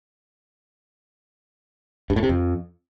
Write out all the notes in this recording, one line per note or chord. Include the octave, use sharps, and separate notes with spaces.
G2
A2
C3
F2